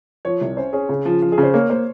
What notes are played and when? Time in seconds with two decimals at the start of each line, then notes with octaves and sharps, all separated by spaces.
0.25 F3 C#5
0.41 C2
0.57 C#4 C5
0.73 C#4 G#4
0.89 C#3
1.05 F3
1.22 F3
1.32 G#4
1.38 C#3
1.43 C5
1.54 A#3 C#5
1.70 A#3 C5